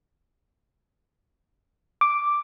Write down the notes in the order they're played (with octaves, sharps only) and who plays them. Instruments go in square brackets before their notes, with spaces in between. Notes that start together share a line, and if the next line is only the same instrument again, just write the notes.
[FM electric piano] D6